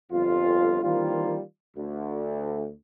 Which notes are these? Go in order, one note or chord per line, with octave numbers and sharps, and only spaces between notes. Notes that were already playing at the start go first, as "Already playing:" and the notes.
G1 F2 F4
D#3 E3 G3 A#3 C4 F4
D2